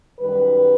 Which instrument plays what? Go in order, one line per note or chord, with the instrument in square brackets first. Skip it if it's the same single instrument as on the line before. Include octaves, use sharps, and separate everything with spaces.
[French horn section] F#2 D#3 G3 B4